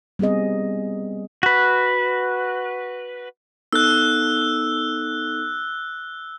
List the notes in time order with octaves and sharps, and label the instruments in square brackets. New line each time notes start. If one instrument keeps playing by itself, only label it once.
[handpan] G3 B3 C4 G#4 D#5
[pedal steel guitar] F#4 B4
[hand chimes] B3 D#4 A4 [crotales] E6 F#6